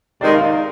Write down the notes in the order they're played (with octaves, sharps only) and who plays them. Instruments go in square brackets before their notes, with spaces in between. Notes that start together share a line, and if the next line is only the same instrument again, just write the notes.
[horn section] C3 D#3 G#3 D#4 [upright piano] D5
[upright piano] F5
D#4 D#5